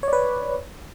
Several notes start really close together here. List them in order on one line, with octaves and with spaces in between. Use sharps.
C#5 D5 B4